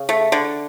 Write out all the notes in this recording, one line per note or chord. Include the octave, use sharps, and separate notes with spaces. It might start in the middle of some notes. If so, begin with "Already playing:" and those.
Already playing: C#3
A3
D3